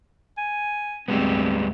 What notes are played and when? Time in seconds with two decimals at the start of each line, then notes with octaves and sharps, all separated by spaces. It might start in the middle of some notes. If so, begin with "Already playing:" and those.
0.38 G#5
1.08 D2 G#2 G3 G#3 B3 C4